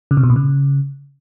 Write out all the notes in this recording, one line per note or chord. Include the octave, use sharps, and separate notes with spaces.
C#3
C3
B2
A#2
C#3